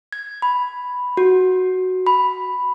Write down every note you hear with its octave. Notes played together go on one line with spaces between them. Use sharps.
G#6
B5
F#4
B5